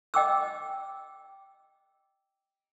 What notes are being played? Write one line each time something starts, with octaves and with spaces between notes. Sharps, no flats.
D#5 G5 D6 E6